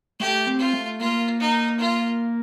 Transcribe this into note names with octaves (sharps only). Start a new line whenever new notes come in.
A3 G4
C4
F4
A3
A#3 F4
D#4
F4